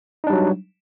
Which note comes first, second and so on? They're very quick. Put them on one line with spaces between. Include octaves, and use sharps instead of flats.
D#4 D4 G3 F#3